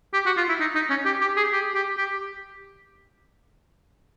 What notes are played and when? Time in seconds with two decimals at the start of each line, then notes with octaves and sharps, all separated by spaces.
0.13 G4
0.26 F#4
0.37 F4
0.49 E4
0.60 D#4
0.75 D#4
0.90 C#4
1.05 G4
1.21 G4
1.37 G#4
1.52 G4
1.74 G4
1.97 G4